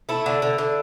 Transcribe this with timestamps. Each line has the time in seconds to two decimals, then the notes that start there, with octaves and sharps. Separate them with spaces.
0.09 A3 E4
0.26 D3
0.42 D3
0.58 D3